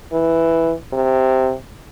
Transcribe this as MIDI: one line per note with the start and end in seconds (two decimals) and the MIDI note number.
0.12 0.73 52
0.93 1.53 48